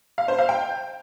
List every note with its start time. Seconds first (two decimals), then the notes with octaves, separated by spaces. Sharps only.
0.18 F5
0.28 C5
0.39 F5
0.49 G5